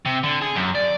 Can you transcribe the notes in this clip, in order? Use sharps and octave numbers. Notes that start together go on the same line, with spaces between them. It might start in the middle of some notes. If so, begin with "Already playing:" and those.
C3
D3
G#4
F#2
D5